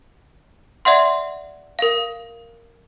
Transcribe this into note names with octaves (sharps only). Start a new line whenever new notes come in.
D5 E5 F#5 C6
A#4 F5